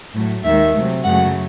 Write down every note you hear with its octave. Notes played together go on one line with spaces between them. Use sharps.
A2 F#3 A3
D#2 D#3 G#3 E5
C3 F#3 A3
F#2 C#3 F#3 A3 F#5